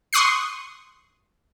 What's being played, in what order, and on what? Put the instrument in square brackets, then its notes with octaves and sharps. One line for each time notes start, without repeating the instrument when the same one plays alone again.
[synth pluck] C6 C#6 D#6 F#6 C7